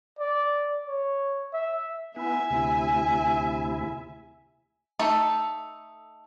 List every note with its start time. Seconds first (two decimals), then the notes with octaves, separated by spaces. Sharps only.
0.19 D5
0.87 C#5
1.53 E5
2.16 B3 E4 E5 G#5
2.50 D2 C3 E4
4.99 A3 D#4 A4